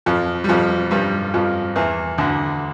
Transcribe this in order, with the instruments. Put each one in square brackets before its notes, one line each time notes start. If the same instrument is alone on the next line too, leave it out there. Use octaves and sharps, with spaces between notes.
[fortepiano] F2 F3
G3
F2 F3
G2 G3
F2 F3
E2 E3
D2 D3